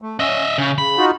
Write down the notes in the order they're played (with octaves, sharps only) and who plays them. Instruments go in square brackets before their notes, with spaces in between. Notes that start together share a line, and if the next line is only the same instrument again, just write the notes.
[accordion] A3
[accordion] C#4 [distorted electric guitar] D#5 E5
[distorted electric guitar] C#3 [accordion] C#4
[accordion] C#3 [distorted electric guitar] B5
[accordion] D#4 F4 F#4